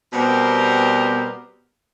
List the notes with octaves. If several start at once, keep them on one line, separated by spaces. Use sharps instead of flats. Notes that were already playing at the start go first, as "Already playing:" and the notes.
B2 G3 B3 C4 G4 A#4